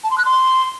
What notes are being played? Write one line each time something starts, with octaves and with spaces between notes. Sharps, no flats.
A5
C6
F#6
C6